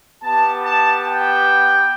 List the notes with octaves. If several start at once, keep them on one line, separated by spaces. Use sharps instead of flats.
B3 G4 A5
A5
G5